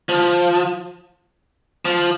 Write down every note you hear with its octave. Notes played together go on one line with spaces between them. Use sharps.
F3
F3